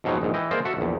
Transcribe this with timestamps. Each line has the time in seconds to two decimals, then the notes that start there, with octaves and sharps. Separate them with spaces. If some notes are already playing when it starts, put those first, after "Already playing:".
0.04 F2 G#2 B2 F#3 D#4
0.21 A#1 G#2
0.34 E3 D#5 G5
0.51 G#3 A#3 A#4 C5 D5
0.65 F#4 A4 E5
0.77 A#1 E2